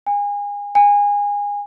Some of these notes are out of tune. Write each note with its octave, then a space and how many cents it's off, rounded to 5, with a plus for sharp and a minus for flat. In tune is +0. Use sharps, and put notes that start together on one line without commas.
G#5 -30
G#5 -25